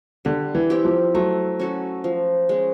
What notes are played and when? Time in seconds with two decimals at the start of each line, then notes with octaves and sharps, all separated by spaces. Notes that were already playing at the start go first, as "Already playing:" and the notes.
0.25 D3 G3
0.55 E3
0.70 C4 E4 G4
0.85 F3
1.14 F#3 A3
1.59 C#4 F#4 A4
2.04 F3
2.49 G#3 C#4